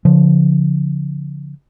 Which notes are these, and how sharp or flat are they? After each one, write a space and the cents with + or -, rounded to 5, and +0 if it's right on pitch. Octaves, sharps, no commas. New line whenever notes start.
D3 -45 F3 +0